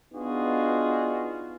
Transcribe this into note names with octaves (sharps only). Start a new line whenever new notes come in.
B3 D4 D#4 F4 F#4 G#4